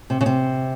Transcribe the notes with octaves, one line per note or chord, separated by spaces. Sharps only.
C3
C#3
C3